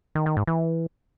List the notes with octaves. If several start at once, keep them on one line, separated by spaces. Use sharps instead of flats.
D#3
D#3
G#2
E3